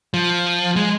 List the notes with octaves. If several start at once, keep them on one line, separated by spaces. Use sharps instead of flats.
F3
G#3